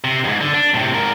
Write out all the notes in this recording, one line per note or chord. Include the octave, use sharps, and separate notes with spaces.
C3
F2 G#2
D3
D4
A2 C3
G#2 A#4